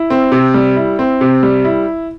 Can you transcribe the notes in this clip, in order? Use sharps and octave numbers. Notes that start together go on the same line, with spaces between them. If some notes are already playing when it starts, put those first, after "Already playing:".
Already playing: E4
C4
C3
G3
E4
C4
C3
G3
E4